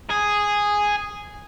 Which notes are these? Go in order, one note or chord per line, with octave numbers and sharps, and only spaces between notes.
G#4